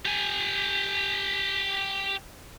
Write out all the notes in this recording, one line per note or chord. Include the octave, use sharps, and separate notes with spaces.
G4 G#5